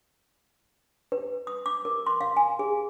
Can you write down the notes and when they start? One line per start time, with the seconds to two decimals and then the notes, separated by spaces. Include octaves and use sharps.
1.12 B4
1.47 D#6
1.66 D6
1.85 A#4
2.06 C6
2.21 F5
2.37 G#5
2.59 G#4